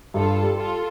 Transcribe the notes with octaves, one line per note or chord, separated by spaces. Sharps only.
G2 F4 A4
G3
F4 A4